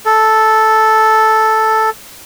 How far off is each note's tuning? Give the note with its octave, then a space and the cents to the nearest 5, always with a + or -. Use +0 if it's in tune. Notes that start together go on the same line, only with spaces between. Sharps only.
A4 -5